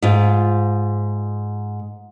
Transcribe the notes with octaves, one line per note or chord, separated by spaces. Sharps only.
G#2 F4